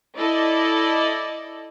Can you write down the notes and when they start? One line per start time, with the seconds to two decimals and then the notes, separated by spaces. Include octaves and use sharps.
0.17 E4 A4 D5 D#5